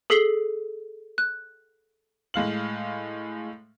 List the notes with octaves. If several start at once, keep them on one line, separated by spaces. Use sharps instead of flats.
G#4 A4 B6 C7 F#7 G7
F#6
A2 G#3 F5 F#7